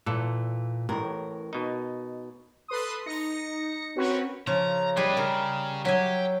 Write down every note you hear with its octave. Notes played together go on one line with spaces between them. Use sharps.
A#2 E3 A4
A1 A2 A#4
B2 D#4
A4 B4 C6 D#6
D#4 A#6 C#7
C4 C#4 F#4 A#4 B4 C#5
C#3 F3 A#5
G3 D4 G#4 B4 D#5
C#3 A#4
F#3 G4 E5 G#5